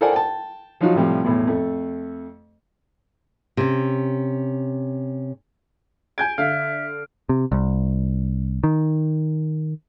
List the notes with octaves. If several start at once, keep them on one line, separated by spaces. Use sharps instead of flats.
A4 A#4 C5 D5 F#5 G#5
G5 A5
F3 F#3 D#4 F4 F#4
A2 C3 F3 G3
B1 E2 A2
F2 A3
C3 C#4
G#5 G6 G#6 D7
D3 E5 F5 F6
C3
C2
D#3